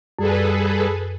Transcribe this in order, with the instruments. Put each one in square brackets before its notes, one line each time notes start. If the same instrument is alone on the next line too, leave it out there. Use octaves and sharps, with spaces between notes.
[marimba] F#2 [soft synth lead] G3 [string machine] G#4 A4 B4